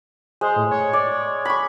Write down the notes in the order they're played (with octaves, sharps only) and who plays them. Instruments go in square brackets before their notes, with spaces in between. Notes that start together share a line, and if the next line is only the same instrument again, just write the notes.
[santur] G#3 [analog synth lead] C5
[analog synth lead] A2
C#5
[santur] D5
B5 C#6